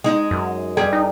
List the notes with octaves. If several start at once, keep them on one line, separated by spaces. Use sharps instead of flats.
G#3 D#4
F#2
G2 G3 G#4
D#4